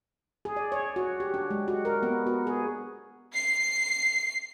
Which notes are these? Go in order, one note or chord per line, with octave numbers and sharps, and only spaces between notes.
G#4
D5
C#5
F#4
G4
D4
G#3
F#4
A#4
B3
F#4
G#4
C7